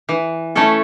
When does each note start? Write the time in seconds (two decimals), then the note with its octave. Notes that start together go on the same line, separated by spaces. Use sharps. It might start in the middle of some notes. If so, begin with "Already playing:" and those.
0.09 E3
0.55 A3 C#4 E4 A4